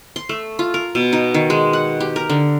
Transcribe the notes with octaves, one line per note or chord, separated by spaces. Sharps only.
C6
A3
F4
A#4
B2
D#4
D#3
G#3
F#5
G4
A#4
D3